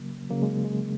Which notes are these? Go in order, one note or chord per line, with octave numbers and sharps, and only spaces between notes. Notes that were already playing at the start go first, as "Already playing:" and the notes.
Already playing: C#3 F#3 A#3
C#3 F#3 A#3
G#3
G#3